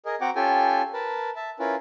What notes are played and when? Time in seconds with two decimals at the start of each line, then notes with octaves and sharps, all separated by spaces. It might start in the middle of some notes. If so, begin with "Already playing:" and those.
0.06 G#4 A#4 D#5
0.21 C4 F#4 F#5 G5 A#5 D6
0.36 C#4 F4 G4 A4 G5 G#5
0.93 A#4 B4 A5
1.36 E5 A5
1.59 C#4 E4 F4 A#4 B4